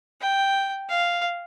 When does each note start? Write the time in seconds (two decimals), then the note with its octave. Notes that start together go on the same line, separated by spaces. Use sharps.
0.22 G5
0.89 F5